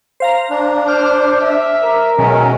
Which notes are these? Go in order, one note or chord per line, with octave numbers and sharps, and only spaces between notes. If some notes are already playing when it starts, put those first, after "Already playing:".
C5 F5 A#5
D4
C5 D6 F6
E5
A#4
B2 D#3 F#3 G#3 C#4